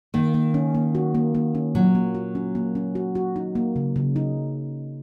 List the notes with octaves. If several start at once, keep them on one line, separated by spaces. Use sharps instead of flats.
D#3 A#3
A#3
C#4
A#3
F#4
A#3
A#3
C#4
A#2 F#3
A#3
F#4
C#4
A#3
C#4
F#4
F#4
D#4
A#3
C#3
C#3
D#4